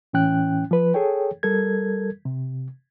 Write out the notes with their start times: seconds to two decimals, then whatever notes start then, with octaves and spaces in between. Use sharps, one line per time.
0.13 A2 E3 C#4 G5 F#6
0.71 F3 B4
0.94 G#4 A4 C#5 G5
1.43 G3 A4 A#4 G#6
2.25 C3